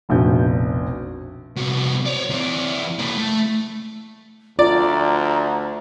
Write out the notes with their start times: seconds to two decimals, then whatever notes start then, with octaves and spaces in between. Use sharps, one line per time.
0.09 F1 A#1 B2 G6
1.57 C2 F#3
2.06 C#5 D5
2.30 E3 D5
2.99 A#3 E4
3.18 A3
4.59 D2 F4 D5 A#5